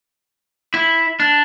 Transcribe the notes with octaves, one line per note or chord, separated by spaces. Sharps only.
E4
D4